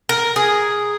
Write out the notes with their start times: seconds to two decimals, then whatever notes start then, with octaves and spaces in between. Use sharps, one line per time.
0.09 A#4
0.36 G#4